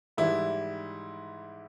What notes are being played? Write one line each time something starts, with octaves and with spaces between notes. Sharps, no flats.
G#2 E3 G3 E4